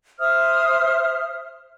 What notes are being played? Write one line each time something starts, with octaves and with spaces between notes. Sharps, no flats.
C5 E5 D#6 F6